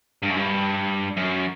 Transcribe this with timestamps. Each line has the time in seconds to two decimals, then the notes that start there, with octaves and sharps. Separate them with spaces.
0.23 G2
0.30 F#2
0.37 G2
1.17 F#2